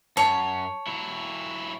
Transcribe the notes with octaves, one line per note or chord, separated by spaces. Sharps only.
F#2 C#5 A5
F#3 E4